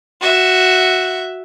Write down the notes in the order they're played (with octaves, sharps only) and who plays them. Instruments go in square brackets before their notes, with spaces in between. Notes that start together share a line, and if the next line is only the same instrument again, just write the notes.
[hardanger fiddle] F#4 E5